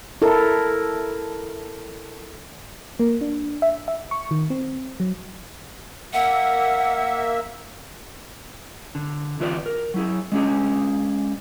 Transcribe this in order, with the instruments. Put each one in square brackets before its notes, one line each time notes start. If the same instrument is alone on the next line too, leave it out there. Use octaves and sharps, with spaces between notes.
[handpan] E4 A4 A#4
[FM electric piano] A#3
D4
E5
E5
C#6
D#3
C4
F#3
[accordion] A#3 E5 [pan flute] F#5
[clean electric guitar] D3
D3 E3 F4 B4 C5 D5
A#4
F#3 E4 G#4
G#3 C#4 D4 G#4